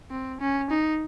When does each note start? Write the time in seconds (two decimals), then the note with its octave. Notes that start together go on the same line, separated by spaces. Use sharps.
0.11 C4
0.40 C#4
0.70 D#4